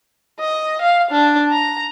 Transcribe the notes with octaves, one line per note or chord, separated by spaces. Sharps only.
D#5
F5
D4
A#5